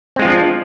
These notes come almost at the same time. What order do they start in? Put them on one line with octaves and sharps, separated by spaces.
C4 G#3 F4 F3 D4